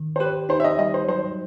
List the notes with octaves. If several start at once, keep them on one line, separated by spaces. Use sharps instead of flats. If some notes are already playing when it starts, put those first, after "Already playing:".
Already playing: D#3
C5
G4 B4
D#4 C5
E5
D#5
G3 D#5
C5
F#3 C5